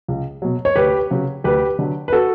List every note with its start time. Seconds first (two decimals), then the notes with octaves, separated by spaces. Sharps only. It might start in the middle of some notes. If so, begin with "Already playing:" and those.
0.08 C#2
0.42 B2 F#3
0.65 C#5
0.75 D2 G4 B4
1.11 C#3 F#3
1.44 D2 G4 B4
1.79 D3 F#3
2.08 B4
2.13 F#4 A4